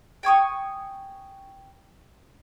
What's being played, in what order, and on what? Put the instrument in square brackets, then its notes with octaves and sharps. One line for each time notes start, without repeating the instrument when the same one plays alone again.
[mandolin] G5 G#5 C#6 D#6